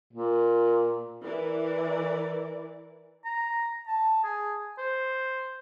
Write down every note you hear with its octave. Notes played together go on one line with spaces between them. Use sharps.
A#2
E3 E4 A#4 D5
A#5
A5
G#4
C5